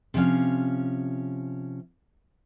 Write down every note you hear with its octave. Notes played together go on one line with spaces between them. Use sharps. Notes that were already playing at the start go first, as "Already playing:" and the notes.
C3 F3 C#4 F5